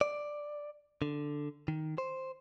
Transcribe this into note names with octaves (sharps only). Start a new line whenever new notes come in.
D5
D3
D#3
C5